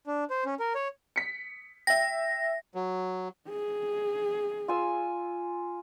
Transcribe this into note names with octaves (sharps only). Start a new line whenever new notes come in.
D4
C5
C#4
A#4
C#5
B6 C#7
E5 G5 A#6
F#3
G#4
F4 G#5 E6